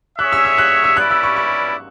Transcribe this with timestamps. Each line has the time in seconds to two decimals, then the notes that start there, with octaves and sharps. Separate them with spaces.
0.18 C#4 G#4 C#5 E5 F#6
0.33 E6
0.45 E6
0.58 F#6
0.84 E6
0.97 C#4 E4 B4 D5 F#6
1.11 E6
1.23 C#6
1.36 C#6